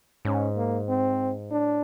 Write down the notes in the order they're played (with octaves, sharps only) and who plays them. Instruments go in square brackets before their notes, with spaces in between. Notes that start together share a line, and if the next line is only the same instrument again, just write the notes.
[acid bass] G#2 [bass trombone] C#4
[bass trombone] A#3
C4
[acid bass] A2 [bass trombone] D4